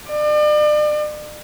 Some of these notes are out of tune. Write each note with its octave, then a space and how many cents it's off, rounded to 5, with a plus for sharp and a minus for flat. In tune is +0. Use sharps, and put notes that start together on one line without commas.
D5 +40